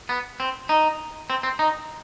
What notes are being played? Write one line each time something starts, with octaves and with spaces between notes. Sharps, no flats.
B3
C4
D#4
C4
C4
D#4